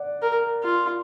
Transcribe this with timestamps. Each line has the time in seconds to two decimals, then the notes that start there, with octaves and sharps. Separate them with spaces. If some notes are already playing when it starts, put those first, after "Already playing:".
Already playing: D5 F#5
0.22 A#4
0.63 F4